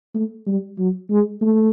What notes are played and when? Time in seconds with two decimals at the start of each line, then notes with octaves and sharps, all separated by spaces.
0.14 A3
0.47 G3
0.78 F#3
1.10 G#3
1.41 A3